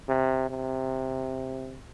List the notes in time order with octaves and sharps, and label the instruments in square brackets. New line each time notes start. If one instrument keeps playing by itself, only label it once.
[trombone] C3
C3